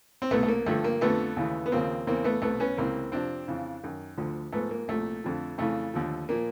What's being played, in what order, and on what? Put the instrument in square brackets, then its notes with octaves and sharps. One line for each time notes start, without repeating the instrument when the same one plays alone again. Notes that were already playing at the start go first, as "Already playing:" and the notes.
[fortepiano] C4
C2 B2 A3 B3
A3
A#3
G2 D3 F3 A3
A#3
F2 D3 F3 A3 B3
D#2 C#3 E3
B3
D#2 C#3 F3 A#3 C4
E2 C#3 E3 A#3 C4
A3 B3
C2 B2 A3 B3
B3 C#4
C#2 C3 E3 A#3 C4
F2 C3 F3 C4 D4
F2 C#3 E3
F#2 D#3
D2 D3 F3
G#2 F3 A3 B3
A#3
C2 A#2 F3 A3
F2 D3 F3
F2 C#3 E3 A3
D#2 D3 F3
A#2 F3 A#3